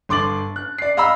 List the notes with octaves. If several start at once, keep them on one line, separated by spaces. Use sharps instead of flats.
G1 C6 D6 A6 F#7
F#6
D5 C7
D#5 F5 A#5 B5 E6